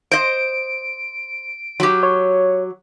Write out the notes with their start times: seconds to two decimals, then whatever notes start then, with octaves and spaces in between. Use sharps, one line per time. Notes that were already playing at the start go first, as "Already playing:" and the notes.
0.11 C5 D#5 D7
1.80 F#3 G4
2.03 C#5